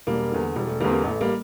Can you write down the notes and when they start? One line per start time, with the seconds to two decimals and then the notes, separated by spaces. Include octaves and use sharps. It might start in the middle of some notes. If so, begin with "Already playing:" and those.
0.07 E1 G3 A#3
0.31 E2 D3
0.56 E1 G3
0.67 A3
0.80 D3 G3 A#3
0.84 E2 C4
0.91 G3 A#3
1.04 A1 A3
1.21 G3 A#3